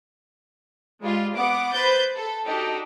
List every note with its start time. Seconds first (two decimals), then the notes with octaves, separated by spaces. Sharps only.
1.01 G3 G#3 F4
1.35 B3 F#5 D6
1.72 B4 C5 G6 A6
2.15 A4
2.45 D4 D#4 F#4 G4 A4